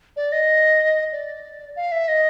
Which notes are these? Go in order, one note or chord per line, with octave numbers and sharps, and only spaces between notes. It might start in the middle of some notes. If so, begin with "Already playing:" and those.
D5
D#5
D5
F5
E5
D#5